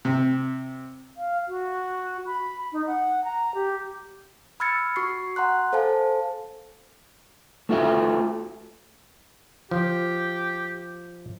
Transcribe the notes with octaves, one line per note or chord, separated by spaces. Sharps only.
C3
F5
F#4
B5
D#4
F#5
A#5
G4
B5 E6 F6 G#6 A6 C#7
F#4 C#6 C7
F#5 A#5 C6 F#6
A4 C5 F5 G#5 A5
A3 F4 F#4 E5
F3 G4